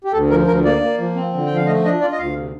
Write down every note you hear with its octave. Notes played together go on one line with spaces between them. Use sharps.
G4
D2 A4
F3 A#4
D2 A#4
A#3 D5
A#3
F3
C4
D3
F3 G5
F5
A3 D#5
D4 D#5
F4 D5
D#5
D2 F5
C3